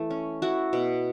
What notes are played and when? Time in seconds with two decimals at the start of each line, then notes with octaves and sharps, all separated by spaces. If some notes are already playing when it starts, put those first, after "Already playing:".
Already playing: E3 A3 E4
0.10 C#4
0.42 E4 F#4
0.73 B2